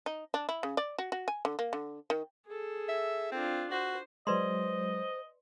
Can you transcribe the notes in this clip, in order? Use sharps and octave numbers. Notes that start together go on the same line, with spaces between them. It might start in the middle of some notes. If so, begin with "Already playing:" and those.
D#4
D4
E4
C#3
D5
F#4
F#4
G#5
D3
A#3
D3
D#3
G#4 A4
E5
C4 D4 F4
F#4 C5
F#3 G#3 B4 C5 D5 D#5 C6